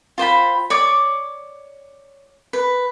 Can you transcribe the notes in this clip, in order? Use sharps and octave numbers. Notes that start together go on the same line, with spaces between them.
F4 C5 G5 B5
C#5 D5 D6
B4